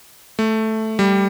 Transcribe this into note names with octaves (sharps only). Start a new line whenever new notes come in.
A3
G3